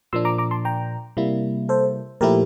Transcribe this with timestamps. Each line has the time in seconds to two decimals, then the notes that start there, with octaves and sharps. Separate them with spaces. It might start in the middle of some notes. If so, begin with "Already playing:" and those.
0.13 A#2 F3 A#3 D4 C6 E6
0.25 A#5 D6
0.38 A#5 D6
0.51 A5 C6
0.65 G5 A#5
1.17 C3 G3 A#3 E4
1.69 A4 C5
2.21 A#2 F3 A3 E4 G4 A#4